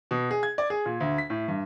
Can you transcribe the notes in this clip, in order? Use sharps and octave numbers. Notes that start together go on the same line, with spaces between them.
B2
G#4
G#6
D5
G#4
A#2
D2
B6
A2
G2